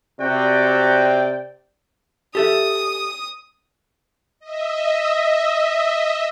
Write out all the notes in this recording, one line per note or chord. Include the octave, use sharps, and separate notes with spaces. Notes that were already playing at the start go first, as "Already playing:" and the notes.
C3 F#4 D5 G5
G4 A4 E5 D#6
D#5 E5